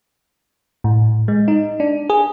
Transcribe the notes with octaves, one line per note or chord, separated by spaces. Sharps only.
A2
G#3
D#4
D4
G#4